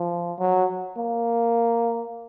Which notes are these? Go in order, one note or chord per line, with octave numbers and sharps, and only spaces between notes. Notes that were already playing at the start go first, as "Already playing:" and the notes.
Already playing: F3
F#3
A#3